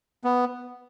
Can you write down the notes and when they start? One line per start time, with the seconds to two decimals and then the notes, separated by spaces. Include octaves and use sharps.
0.24 B3